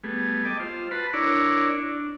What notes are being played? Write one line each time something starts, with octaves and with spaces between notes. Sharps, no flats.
G3 A3 B3 G#4
D#5 G5 A5 D6
F4 C5
F#4 B4 A5 B5 C6
D4 E4 A#4 C#5 D5
D4